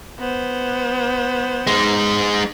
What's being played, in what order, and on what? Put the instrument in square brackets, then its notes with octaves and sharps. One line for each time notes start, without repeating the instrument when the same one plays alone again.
[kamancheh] B3 C5
[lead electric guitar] G#3 D#4